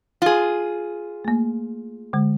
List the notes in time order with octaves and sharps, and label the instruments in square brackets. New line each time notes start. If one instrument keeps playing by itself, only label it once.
[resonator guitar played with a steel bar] F4 G#4
[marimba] A3 A#3
D3 G#3